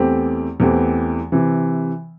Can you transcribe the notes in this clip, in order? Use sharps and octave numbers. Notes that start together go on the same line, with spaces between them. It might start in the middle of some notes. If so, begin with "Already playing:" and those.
Already playing: E2 E3 A3 C4 G4
E2 E3 A3 C4 G4
C3 E3